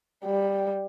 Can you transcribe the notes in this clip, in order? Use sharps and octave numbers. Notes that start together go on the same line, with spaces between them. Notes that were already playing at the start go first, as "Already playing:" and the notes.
G3